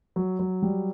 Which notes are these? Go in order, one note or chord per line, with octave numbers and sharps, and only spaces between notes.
F#3
F#3
G3